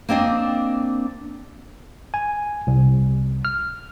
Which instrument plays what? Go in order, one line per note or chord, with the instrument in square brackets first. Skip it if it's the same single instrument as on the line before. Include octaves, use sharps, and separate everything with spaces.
[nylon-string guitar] A#3 C4 D4 D#5
[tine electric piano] G#5
C2
F6